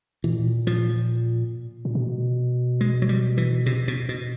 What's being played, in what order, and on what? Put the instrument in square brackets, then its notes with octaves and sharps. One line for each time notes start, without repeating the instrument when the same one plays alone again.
[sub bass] A#2 [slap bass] E3
[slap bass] F3
[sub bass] A#2
B2
[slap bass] G#3
F#3
G3
E3
C3
B2
B2